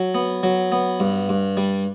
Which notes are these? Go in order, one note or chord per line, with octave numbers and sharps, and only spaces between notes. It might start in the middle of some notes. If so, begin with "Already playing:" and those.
Already playing: F#3
B3
F#3
B3
G2
G2
G3